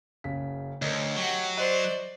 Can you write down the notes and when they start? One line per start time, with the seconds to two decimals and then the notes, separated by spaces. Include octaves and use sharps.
0.24 F#1 C#3 B6
0.82 D2 A#4 C#5 D#5
1.16 F#3 G4 F#5
1.57 C5 D5 D#5 F#6 D#7